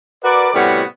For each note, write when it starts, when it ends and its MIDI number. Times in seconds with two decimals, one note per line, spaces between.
0.24 0.49 66
0.24 0.49 70
0.24 0.49 71
0.24 0.49 74
0.54 0.83 45
0.54 0.83 48
0.54 0.83 55
0.54 0.83 59
0.54 0.83 61
0.54 0.83 66